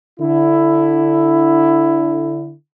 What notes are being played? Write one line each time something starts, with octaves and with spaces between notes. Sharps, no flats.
D3 E4